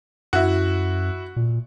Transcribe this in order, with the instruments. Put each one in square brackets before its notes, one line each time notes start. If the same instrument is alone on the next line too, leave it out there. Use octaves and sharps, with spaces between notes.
[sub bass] F#2 [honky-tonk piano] E4 F#4
[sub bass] A#2